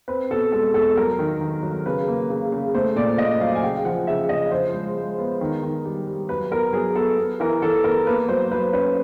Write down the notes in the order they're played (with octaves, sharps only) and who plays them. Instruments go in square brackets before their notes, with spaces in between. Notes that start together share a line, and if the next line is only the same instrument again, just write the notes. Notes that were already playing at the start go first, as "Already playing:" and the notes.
[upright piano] C4 B4
B2 A4
G#3 A4
E2 A4
F#3 A#4
D#3
D#3
F#3
C#3 B4
A#3
C#3
C#3
A3 C5
A#2 D5
A#2 D#5
F#3 F5
G#5
C#3 G5
F3 F#5
C#3 E5
C#3 D#5
F3 C5
G#3
G#3
B3
D#3
D#3
G3
G3
F#3 B4
B3 A#4
F#3 G#4
B3 A4
B3
E3 A#4
E3 A4
B3 A#4
A#3 B4
F#3 C5
F#3 B4
C#4 B4